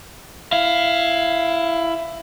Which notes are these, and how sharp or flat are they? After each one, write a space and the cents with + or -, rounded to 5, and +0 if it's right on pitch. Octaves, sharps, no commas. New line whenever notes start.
E4 +15 F5 +0